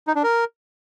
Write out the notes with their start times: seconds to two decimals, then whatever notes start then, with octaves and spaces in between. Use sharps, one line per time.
0.07 D#4
0.15 D4
0.23 A#4